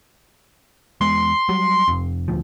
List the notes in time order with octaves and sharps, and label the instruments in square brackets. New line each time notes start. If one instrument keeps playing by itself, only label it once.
[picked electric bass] E2 G#3 B3 [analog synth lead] C6
[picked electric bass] F#3 G3
F1 F2
D#1 D2 F3